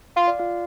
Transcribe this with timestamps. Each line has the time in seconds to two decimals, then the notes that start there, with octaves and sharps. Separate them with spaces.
0.16 F4 F5
0.27 D5
0.39 F4 F5